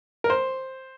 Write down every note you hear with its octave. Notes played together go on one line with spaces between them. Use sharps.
A#4
C5